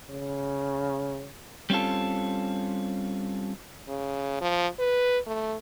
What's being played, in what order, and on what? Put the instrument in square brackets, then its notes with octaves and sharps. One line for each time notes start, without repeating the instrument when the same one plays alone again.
[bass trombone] C#3
[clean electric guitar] G3 C4 C#4 F4 A4
[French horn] C#3
F3
B4
A3